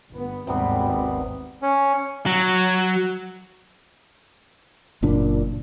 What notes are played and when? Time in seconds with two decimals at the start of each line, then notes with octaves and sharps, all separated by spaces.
0.10 G1 B3
0.47 G#1 D#2 G#2 C3 G3 B3
1.62 C#4
2.26 F#3
5.03 F#1 A#2 D4